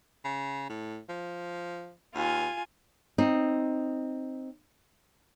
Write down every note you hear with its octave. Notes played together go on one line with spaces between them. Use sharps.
C#3
A2
F3
D#2 F4 G#5
C4 D#4